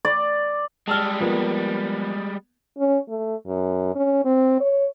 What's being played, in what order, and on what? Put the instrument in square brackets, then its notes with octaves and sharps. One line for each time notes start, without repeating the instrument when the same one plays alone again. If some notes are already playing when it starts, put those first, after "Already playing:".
[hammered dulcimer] D5
[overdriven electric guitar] G3 G#3 [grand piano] A5 E6 F6
[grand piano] F3 A#3 B3
[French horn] C#4
A3
F#2
C#4
C4
C#5